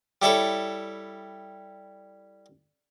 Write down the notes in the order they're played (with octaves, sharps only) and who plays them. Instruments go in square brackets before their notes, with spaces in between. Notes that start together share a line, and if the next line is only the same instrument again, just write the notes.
[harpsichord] G3 E4 A4 C#5